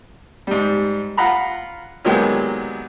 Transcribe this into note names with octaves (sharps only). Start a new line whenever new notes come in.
G#2 G3
F4 F#5 A#5 B5
A#2 D#3 F#3 G#3 B3 G4